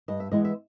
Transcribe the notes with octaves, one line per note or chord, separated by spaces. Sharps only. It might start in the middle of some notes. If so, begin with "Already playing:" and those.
G2 D#5
E5
E3 G#3 B3 D#5
E5